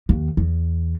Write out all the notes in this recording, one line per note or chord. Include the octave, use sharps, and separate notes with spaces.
D#2
E2